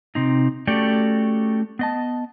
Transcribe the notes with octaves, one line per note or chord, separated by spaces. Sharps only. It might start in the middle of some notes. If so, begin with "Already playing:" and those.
C3 C4 D#4
A3 C#4 F#4 G4 A4 D5
B3 D#5 A5